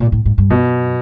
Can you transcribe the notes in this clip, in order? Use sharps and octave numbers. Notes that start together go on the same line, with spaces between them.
A#2
A2
G#2
G2
F#2 B2